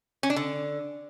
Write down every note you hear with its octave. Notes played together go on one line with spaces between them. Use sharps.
C#4
D4
D3